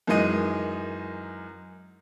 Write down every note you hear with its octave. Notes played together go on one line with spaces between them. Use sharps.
F#2 D#3 E3 G#3 D#5 D#7